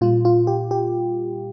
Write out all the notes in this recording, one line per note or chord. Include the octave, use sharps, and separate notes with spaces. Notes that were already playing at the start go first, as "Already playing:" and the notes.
A#2 G3 F4
F4
G4
G4